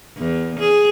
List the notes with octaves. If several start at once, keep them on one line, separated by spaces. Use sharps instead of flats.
E2
G#4